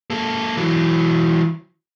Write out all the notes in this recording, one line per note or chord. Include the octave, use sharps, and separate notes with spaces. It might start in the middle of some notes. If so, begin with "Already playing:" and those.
A#3 A4
E3 F#3